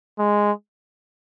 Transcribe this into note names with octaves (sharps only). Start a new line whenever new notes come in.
G#3